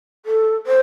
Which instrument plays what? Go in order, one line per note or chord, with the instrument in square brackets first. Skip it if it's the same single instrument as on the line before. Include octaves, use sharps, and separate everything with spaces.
[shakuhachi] A4
C5